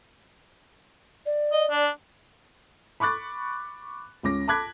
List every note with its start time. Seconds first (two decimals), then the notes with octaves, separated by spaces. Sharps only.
1.26 D5
1.52 D#5
1.71 D4
3.00 B5 C#6 D6 F#6 A6
4.23 C#2 C#4 D6 A#6
4.48 A5 B5 D6 F#6 G#6 B6